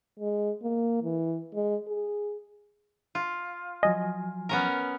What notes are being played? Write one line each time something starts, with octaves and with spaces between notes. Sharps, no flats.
G#3
A#3
E3
G#3
G#4
F4
F3 F#3 D#5 G#5
B3 C#4 A#4